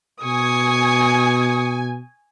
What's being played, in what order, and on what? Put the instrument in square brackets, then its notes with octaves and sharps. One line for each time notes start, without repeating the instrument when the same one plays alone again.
[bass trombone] B2 [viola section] G#5 [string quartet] C#6 D#6